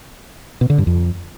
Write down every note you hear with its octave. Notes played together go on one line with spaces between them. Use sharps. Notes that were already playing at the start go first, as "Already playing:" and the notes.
B2
D3
G2
F2